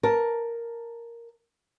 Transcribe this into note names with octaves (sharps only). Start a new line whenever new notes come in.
A#4 A5